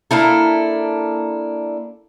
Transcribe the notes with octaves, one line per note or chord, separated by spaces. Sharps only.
A#3 D4 E4 A4